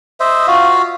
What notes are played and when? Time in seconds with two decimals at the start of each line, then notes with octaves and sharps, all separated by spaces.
0.20 C5 D#5 E5
0.47 F4 F#4 F5